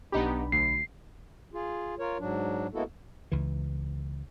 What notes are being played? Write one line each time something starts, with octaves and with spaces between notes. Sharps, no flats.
B1 B3 D4 D#4 G4 B5
D2 C7
F4 G#4
F4 A#4 C#5
G#2 F#3 D4
G#3 A#3 B3 E4 F#4 A4
C#2 E3